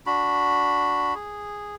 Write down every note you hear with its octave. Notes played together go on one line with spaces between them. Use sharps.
D4 F#4 B5
G#4